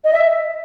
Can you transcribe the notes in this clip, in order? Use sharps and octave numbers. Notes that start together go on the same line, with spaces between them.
D#5
E5